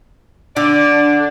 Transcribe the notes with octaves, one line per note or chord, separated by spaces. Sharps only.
D3 D4 D5